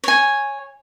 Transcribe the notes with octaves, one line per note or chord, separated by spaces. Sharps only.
C#5 G#5